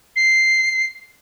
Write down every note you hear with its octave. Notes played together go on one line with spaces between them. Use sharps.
C7